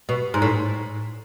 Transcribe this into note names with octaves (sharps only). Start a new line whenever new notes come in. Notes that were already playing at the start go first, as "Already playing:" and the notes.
B2
G#2
A2